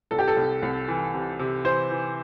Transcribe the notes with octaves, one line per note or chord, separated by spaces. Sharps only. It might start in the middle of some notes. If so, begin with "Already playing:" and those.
C2 A4
G4
A4
C2
C2
E3
C3
C3
E3 C5
E3